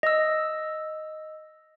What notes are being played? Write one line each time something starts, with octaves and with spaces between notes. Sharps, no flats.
D#5 E6